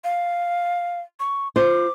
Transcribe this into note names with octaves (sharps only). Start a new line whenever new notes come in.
F5
C#6
F4 C5 D6